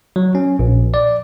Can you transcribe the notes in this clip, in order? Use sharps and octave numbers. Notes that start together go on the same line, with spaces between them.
F#3
C#4
A#1
D5